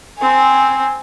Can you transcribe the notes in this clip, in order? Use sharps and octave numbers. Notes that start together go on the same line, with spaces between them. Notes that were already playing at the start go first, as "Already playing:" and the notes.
C4 G#5